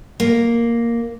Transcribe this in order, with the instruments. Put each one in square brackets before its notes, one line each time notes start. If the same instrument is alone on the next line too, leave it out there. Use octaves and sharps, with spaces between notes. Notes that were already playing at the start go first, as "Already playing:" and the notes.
[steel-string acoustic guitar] A#3